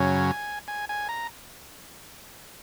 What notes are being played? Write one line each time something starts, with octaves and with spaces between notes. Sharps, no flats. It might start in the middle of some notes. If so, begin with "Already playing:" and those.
Already playing: F#2 C#3 F#3 C#4 G#5
G#5
G#5
A#5